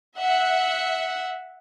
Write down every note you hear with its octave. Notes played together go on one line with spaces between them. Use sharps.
E5 F#5